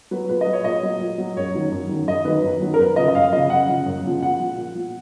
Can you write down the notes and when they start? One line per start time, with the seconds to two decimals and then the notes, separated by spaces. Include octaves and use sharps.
0.11 F#3 B4
0.29 A#2 B4
0.41 D#5
0.47 F#3
0.53 C#5
0.64 A#2 D#5
0.83 F#3
1.00 A#2
1.18 F#3
1.37 F#2 C#5
1.54 D#3 F#3
1.72 F#2
1.89 D#3 F#3
2.07 F#2 D#5
2.25 D#3 F#3 B4
2.43 F#2
2.61 D#3 F#3
2.74 A#4
2.79 F#2 B4
2.96 C#3 F3 D#5
3.08 D#5
3.15 F#2 F5
3.32 C#3 F3 D#5
3.50 F#2 F#5
3.68 C#3 F3
3.86 F#2
4.04 C#3 F3
4.21 A#2 F#5
4.40 F3
4.57 A#2
4.75 F3